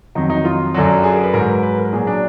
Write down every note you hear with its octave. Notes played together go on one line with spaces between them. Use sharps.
F2 D#3 F#3 D#4
D#4
F4
F#2 D3 F#3
G#4
A#4
B4
G#2 F#3 A#4
B4
B4
A#4
A#2 F#3 G#4
D4